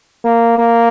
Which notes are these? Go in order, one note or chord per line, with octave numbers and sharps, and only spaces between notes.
A#3
A#3